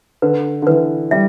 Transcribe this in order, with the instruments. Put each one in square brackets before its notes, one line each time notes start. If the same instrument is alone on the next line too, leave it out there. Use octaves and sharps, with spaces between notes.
[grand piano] D3 [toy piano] B4
[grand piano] D3
[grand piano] E3 [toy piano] B4
[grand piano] G3 [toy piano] E5